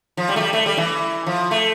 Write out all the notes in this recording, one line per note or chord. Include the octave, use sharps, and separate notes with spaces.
F3
G3
A3
G3
A3
G3
E3
F3
A3